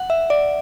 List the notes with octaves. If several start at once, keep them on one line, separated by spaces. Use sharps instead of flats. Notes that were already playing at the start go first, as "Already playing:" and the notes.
Already playing: F#5
E5
D5